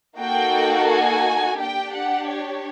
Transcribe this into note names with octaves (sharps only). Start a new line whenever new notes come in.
A#3 D#4 F#4 A4 G5
G#5
D4 G4 G5
F#5
C#5